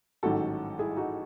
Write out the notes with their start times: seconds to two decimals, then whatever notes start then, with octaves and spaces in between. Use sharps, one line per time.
0.23 A1 G#2 D#3 F#3 F#4 A4
0.79 E4 G#4
0.97 D#4 F#4